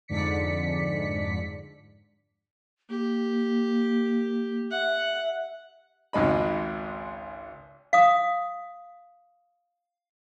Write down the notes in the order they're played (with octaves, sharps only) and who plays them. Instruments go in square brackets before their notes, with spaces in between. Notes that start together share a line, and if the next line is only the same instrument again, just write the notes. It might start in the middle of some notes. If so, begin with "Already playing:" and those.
[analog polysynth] F2 G#2 D3 D5 B6 C#7
[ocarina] A#3 [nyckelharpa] G4
[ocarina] E5 [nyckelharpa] F#5
[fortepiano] G#1 C#2 G#2 D#5 B5
[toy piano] F5 D#6